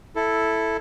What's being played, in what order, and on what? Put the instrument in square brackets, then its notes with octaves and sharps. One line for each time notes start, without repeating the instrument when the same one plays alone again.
[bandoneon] E4 A4